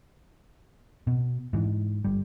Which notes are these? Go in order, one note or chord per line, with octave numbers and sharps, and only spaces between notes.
B2
G#2 E3
G1 G3